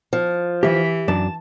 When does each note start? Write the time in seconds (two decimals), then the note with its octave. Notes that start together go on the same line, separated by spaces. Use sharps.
0.13 F3
0.63 E3 G4 E5
1.08 F#2 D4 A5